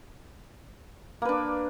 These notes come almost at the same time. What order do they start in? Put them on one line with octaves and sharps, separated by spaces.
A#3 B4 D4